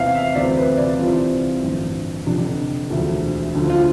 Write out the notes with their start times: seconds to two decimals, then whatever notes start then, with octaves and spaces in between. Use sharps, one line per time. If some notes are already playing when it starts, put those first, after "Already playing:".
Already playing: E2 C3 E3 F5
0.15 E5
0.35 D2 C3 E3 D5
0.57 B4
0.78 D5
0.99 C2 C3 E3 F4
1.63 A1 G2 D3 F3
2.26 F1 F2 D3 D4
2.90 E1 D2 D3 F3
3.54 D2 D3 F3
3.70 F4